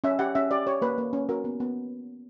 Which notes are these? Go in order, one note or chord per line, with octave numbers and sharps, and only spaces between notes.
C#4 E5
G4 F#5
C#4 E5
G4 D5
G4 C#5
A#3 B4
A#3
C#4
F#4 A#4
B3
B3